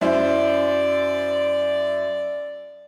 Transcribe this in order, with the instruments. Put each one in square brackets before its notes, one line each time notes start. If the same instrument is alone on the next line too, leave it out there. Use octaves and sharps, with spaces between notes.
[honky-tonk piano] F#2 E4 C5 [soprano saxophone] D5